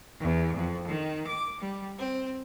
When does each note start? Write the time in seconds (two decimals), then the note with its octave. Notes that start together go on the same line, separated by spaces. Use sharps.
0.19 E2
0.56 F2
0.87 D#3
1.26 D6
1.59 G3
1.97 C4